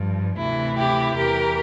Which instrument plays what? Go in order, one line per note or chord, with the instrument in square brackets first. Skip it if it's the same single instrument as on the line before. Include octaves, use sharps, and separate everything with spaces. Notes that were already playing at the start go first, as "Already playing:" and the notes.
Already playing: [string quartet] G2 F3
D2 C3 E3 E4
E4 G4
E2 E3 G4 A#4